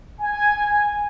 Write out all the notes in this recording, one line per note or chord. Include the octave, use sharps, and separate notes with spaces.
G#5